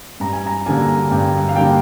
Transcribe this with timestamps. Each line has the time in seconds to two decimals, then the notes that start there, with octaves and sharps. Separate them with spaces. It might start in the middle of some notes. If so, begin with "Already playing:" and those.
0.20 G2 A#5
0.33 G#5
0.46 A#5
0.66 D3 G3 A#3 G#5
1.11 G2 G5
1.49 F5
1.56 D3 G3 A#3 G5